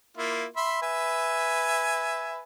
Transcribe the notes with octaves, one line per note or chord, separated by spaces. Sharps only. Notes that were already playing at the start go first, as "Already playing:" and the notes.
A#3 E4 F4
E5 B5 C6
B4 E5 G#5